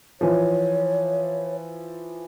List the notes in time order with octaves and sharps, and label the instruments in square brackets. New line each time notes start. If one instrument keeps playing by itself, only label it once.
[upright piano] E3 F3 [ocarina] C#5